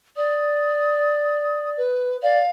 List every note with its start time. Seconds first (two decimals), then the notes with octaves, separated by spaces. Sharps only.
0.16 D5 D#6
1.77 B4
2.22 D5 F5